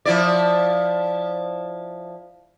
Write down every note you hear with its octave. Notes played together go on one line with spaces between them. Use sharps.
F3 E4 D5